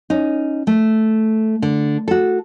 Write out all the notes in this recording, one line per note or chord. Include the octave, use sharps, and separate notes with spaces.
C#4 D#4
A3
D3
F#4 A4